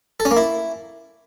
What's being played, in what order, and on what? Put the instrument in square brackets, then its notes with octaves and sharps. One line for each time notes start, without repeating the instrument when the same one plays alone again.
[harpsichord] A4
C#4
A#3
E4